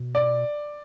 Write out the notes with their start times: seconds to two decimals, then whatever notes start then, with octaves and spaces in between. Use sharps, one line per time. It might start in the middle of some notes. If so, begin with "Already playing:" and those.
Already playing: B2
0.15 D5